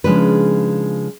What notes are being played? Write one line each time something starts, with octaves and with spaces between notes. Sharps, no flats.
C#3 F3 G#3 D4 D#4 B4